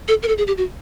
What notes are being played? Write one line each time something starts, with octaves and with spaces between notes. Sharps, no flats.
A4
A#4
A4
G#4
G4
F#4